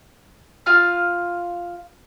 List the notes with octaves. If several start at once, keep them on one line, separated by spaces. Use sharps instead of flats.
F4 F5 F6